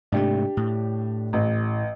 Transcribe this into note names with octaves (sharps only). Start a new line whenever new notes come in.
G#2 C3 A3 D4 G4
A2
A1